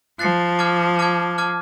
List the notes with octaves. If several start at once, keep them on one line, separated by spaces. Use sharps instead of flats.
F3 F#6 A6 C7
A5 D6 F6 G#6
A5 D6 F6 G#6
A5 D6 F6 G#6